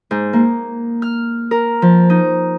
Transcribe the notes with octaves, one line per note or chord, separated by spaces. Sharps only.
G#2
A#3
F6
A#4
F3
D#4